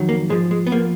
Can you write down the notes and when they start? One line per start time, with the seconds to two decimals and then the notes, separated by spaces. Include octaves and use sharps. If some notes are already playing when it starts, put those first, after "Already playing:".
Already playing: F2 D#3 F#3
0.09 A#3
0.30 G#2 F3 G#3
0.51 G#3
0.67 B3
0.72 F3 A#3